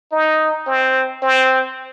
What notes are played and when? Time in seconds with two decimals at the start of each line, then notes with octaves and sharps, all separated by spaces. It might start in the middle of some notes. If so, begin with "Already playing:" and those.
0.12 D#4
0.67 C4
1.22 C4